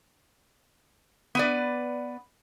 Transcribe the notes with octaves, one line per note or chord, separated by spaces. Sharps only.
B3 B4 D5